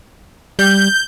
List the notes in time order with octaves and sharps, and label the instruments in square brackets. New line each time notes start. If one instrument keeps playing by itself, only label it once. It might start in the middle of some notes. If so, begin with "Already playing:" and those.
[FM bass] G3 [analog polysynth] G6